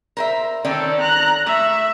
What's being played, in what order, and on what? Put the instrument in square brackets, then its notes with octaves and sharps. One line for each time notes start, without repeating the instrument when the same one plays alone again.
[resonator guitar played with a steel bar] A#4 C5 E5
[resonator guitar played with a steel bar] D#3 C#4 D5 [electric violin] C4 A4
[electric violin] A#5 F#6
[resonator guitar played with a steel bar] A3 [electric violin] E5